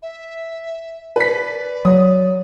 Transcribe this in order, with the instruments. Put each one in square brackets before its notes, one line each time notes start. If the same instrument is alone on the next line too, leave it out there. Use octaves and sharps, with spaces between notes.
[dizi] E5
[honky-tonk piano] B4 B6 [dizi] D5
[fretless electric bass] F#3 [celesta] C#5 [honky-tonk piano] D#6